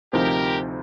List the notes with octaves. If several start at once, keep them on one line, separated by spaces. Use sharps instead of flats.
D2 C3 F3 C4 D#4 G4 A#4